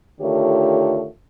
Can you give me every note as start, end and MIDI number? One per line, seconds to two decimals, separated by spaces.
0.21 1.05 50
0.21 1.05 51
0.21 1.05 57
0.21 1.05 65
0.21 1.05 67
0.21 1.05 73